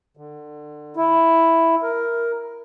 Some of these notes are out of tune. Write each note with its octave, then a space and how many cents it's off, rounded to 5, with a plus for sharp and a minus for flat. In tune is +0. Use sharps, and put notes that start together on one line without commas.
D3 +25
E4 +0
A#4 +5